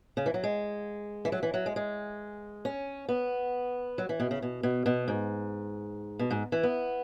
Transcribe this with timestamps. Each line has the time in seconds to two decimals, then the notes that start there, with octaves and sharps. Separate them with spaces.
0.17 C#3
0.26 E3
0.34 F#3
0.44 G#3
1.25 E3
1.32 F#3
1.43 E3
1.54 F#3
1.66 G#3
1.76 G#3
2.65 C#4
3.09 B3
3.98 F#3
4.09 E3
4.20 B2
4.31 C#3
4.42 B2
4.63 B2
4.86 B2
5.08 G#2
6.19 B2
6.31 G#2
6.52 E3
6.63 B3